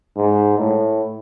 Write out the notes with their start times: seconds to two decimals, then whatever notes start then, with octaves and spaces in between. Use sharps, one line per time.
0.17 G#2
0.59 A2